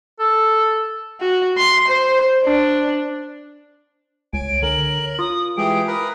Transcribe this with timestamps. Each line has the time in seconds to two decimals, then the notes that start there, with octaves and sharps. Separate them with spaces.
0.20 A4
1.20 F#4
1.57 C6
1.88 C5
2.44 D4
4.33 C#2 C#5 G#5 D7
4.62 D3 A#4 F#7
5.19 F4 D#6
5.57 E3 G#3 G4 G#4 D7
5.87 A#4 B4 B5 D#6